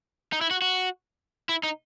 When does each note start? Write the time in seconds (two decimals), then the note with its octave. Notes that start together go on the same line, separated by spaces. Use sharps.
0.33 D#4
0.41 E4
0.51 F#4
0.62 F#4
1.49 E4
1.63 D#4